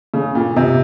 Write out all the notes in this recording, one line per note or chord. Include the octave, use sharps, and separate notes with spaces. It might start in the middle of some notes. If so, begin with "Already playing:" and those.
C#3
A#2
C3